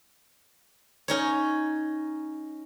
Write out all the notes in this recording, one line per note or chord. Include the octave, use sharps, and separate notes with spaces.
C#4 D#4 C#5